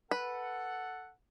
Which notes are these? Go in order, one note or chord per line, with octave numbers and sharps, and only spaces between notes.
A4 B4 F#5